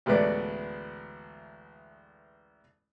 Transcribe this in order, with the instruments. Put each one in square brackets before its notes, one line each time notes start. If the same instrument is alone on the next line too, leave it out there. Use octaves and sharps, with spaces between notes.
[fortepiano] A1 D2 G#3 B3 B4 D5